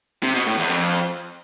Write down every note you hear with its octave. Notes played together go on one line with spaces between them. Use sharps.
C3
B2
A2
E2
F2